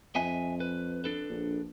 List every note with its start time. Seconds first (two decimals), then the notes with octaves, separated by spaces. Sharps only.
0.15 F2 D#5 E5 G#5
0.60 B4
1.04 D4 A4 B4
1.30 A#1